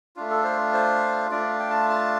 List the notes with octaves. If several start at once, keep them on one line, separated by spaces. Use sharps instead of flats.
A3 D4 F4
A4
C5
C5
A3 D4 F4 D5
G5
A5
A5